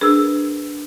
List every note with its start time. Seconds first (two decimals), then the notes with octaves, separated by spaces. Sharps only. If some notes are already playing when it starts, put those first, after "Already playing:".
0.01 D4 G#4 A#4 B4 E6